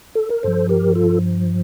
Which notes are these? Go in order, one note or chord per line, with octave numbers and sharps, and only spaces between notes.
A4
A#4
G2 F3 A4 C5
G4 A#4
F4 A4